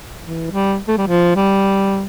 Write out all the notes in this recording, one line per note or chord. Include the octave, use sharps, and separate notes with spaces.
E3
G3
A3
G3
F3
G3